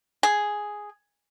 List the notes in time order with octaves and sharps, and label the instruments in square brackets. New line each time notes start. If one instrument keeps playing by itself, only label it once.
[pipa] G#4